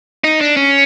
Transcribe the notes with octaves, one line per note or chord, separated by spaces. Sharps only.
D#4
D4
C#4